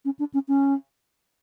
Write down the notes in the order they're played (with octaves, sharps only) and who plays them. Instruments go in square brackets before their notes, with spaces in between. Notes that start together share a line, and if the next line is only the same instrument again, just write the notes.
[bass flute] C#4
D4
C#4
C#4